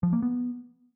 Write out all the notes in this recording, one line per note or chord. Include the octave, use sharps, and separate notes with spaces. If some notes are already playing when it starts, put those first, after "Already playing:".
F3
A#3
B3